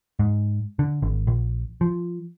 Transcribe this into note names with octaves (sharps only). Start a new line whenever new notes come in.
G#2
D3
G#1
A#1
F3